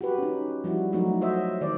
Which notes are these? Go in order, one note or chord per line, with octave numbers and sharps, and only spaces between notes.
F#4 G4 B4
C#4 D#4
F3 G3 E4 F#4
F3 F#3 A3 D#4 F#4
F#4 C5 C#5 D#5 E5
D#3 C5 D5